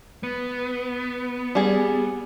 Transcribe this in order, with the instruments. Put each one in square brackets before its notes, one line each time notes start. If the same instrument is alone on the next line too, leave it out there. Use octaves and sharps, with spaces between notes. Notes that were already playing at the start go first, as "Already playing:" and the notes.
[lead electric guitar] B3
[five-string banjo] G3 G#4